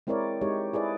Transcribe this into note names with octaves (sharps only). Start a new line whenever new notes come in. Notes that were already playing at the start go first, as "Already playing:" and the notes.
G#3 C4 E4 A#4 C#5 D5
G#3 D#4 G4 C#5
E4 G#4 B4 D5